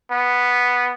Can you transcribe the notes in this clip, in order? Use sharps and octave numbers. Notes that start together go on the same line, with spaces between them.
B3